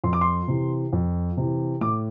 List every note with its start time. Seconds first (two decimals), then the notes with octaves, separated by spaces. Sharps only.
0.04 F2 C6
0.13 D6
0.21 C6
0.48 C3 E3
0.93 F2
1.37 C3 E3
1.81 A2 D6